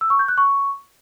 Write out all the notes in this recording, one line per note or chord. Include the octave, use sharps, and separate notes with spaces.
E6
C#6
G6
F#6
C#6